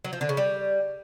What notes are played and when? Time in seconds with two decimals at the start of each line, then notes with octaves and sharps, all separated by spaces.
0.05 F#3
0.13 F3
0.21 D3
0.29 C#3
0.37 G3